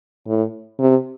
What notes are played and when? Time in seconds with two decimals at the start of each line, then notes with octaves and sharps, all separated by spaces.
0.27 A2
0.79 C3